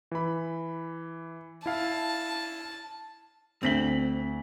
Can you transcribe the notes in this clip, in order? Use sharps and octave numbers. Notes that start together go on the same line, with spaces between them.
E3 B5
E4 F5 A5
D2 C4 B6 F#7